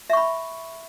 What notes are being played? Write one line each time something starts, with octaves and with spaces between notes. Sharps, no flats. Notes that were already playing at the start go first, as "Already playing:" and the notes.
E5 B5 C#6